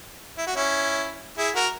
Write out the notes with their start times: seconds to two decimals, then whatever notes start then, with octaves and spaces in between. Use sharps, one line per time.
0.38 E4
0.47 F#4
0.56 C#4 E4
1.38 E4 G#4
1.55 F#4 A#4